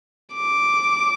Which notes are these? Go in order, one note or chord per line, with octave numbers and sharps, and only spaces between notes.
D6